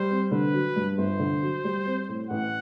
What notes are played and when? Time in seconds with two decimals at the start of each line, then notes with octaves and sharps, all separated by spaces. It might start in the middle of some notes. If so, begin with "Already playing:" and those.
Already playing: G3 C5
0.10 C4
0.31 D3 B4
0.54 F#3
0.76 G2
0.98 G1 C5
1.20 D3
1.43 F#3
1.64 G3
1.86 C4
2.09 A2
2.30 A1 F#5